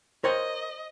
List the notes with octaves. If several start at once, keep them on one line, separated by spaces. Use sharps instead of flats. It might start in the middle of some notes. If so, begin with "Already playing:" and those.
A#4 C5 C#5 D#5 G5